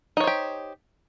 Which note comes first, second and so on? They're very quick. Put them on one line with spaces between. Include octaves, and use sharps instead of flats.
D#4 C#5 C5 G4